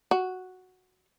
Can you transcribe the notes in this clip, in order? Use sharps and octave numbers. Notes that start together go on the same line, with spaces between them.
F#4